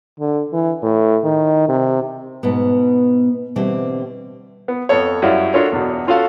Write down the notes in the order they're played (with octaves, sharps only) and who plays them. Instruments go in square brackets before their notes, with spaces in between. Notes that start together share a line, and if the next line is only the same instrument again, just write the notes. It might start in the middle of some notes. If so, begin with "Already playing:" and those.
[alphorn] D3
E3
A2
D#3
C3
[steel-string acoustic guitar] G#2 B2 B3
B2 D3 E3 G3 C4 G4
[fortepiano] B3
F2 B3 A4 C#5
F#2 G3 E4 C#5 D5 F5
D4 F4 F#4 A4 A#4 C#5
E2 B2
C#4 F4 F#4 A4 F5 F#5